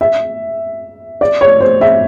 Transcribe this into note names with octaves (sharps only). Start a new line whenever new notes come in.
E5
D5
C#5
C5
E5